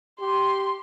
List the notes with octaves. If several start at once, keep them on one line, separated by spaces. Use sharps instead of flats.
G4 C6